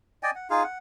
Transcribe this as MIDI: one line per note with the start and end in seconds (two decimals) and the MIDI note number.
0.23 0.31 74
0.23 0.31 75
0.23 0.31 79
0.23 0.31 80
0.35 0.48 78
0.50 0.63 63
0.50 0.63 65
0.50 0.63 68
0.50 0.63 77
0.64 0.78 78